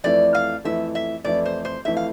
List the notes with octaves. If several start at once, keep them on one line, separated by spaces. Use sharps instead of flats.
F2 E3 A3 E4 D5
F5
F2 E3 A3 E4 E5
E5
F2 E3 A3 E4 D5
C5
C5
F2 E3 A3 E4 E5
F5